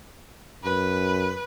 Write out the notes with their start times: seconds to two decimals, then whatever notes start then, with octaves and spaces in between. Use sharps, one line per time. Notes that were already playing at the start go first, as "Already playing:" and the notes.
0.64 F#2 B4